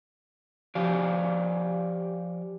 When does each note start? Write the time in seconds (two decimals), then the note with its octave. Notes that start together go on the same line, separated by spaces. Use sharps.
0.75 F3 G4 D5 F5 G#5